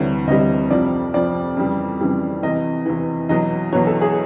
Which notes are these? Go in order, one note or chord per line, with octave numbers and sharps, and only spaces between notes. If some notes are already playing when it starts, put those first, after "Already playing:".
Already playing: D2 C3 E3 G3 C#5
D2 C3 E3 G3 D#5
F2 C3 F3 D5
F2 C3 F3 D5
F2 C#3 E3 G3
F2 C#3 E3 G3
E2 C3 E3 D#5
E2 C3 E3
E2 B2 F#3 D#5
E2 B2 F#3 C#5
A4
G#4